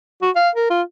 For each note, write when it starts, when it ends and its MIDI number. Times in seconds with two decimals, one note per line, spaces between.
0.22 0.30 66
0.36 0.49 77
0.55 0.69 70
0.70 0.82 65